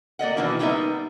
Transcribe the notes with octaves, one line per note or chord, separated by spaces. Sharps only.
A#3 D5 D#5 F#5
B2 D#3 E3 A#3 D4 F#4
G3 A#3 B3 D#4 C#5 E5